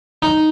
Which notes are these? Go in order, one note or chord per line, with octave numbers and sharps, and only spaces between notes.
D#4